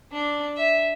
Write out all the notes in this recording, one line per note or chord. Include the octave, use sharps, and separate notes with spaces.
D4
E5